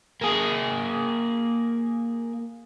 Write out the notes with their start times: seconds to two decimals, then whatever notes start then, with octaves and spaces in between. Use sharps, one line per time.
0.22 A#3 G#4